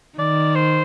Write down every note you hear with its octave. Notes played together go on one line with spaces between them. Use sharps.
D#3 D5
C5